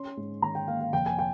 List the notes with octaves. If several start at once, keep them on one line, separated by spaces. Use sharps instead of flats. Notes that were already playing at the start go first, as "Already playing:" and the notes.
Already playing: C#4 C6
G#2
D#3 A#5
G5
A#3 F5
F5
F1 G5
G#5
G5